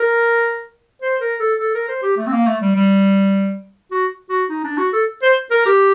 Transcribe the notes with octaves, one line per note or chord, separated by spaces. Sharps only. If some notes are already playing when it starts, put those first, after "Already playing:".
Already playing: A#4
C5
A#4
A4
A4
A#4
C5
G4
A3
C4
A#3
A3
G3
G3
F#4
F#4
D#4
D4
F#4
A4
C5
A#4
G4